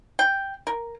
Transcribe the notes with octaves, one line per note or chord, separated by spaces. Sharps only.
G5
A#4